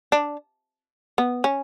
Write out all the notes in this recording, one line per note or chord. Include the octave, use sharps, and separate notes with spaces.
D4
B3
C#4